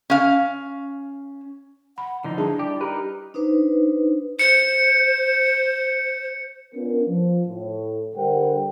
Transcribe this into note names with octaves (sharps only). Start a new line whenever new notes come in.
C#4 F5
F#5 B5
D3 F3 D#4 E4
G3 D4 G#4 A5
G4 D5
D#4 G4 A#4 B4
D4 D#4 B4 C5
C5 C#7
B3 C#4 D4 F4 A#4
F3
A2
D3 G3 A#4 C5 F#5 G5